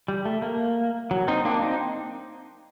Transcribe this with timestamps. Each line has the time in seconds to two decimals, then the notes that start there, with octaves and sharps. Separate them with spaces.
0.08 G3
0.25 A3
0.42 A#3
1.11 F#3
1.28 C4 D#4
1.45 A#3 D4
1.62 C4 D#4